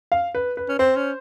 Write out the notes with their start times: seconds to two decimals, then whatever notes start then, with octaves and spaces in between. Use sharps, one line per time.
0.12 F5
0.35 B4
0.57 B4
0.69 C#4
0.79 C4 C5
0.97 C#4